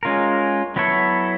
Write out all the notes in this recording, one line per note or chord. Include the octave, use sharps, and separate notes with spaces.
G#3 C#4 F4 A#4
F#3 B3 E4 A4 C#5